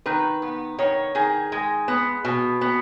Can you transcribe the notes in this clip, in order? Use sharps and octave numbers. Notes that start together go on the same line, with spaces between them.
D#3 B4
B3
D#3 C#5
D#3 G#4
G#3
B3
B2
B3